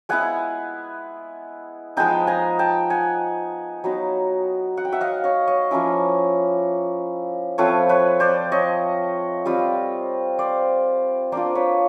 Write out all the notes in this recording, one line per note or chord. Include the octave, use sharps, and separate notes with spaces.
G#3 B3 E4 F#5 G#5
F3 G#3 B3 D#4 G5 A5
G#5 A#5
G5 A5
F#5 G#5
F#3 B3 D#4
F#5
G5
E5 F#5
D#5 F5
C#5 D#5
C#5 D#5
F3 A#3 C#4 E4
F3 A3 C4 F4 B4 C#5
B4 C#5
C5 D5
C#5 D#5
G3 C4 F4
C5 D5
A#3 D4 F4 C5 D5
B4 C#5